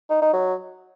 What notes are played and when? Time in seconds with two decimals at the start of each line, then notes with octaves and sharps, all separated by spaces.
0.10 D#4
0.22 D#4
0.33 F#3